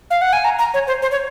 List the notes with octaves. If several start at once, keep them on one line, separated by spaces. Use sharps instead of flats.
F5
F#5
G#5
A#5
A#5
C#5
C5
C5
C#5